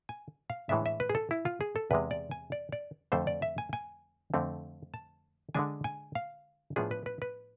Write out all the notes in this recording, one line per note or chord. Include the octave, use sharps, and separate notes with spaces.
G#5
F5
A2 E3 G#3 D4 E5
E5
B4
G#4
A4
E4
F4
G#4
A4
E2 C3 G#3 B4
D5
G#5
D5
D5
F2 D3 A3 C5
D5
E5
G#5
G#5
F2 D3 A3 C4
A5
D3 G#3 D4 G#5
G#5
F5
A2 F3 B3 D4 G#4
B4
B4
B4